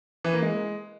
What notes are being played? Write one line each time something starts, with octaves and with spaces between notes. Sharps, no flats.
E3
A#3
G#3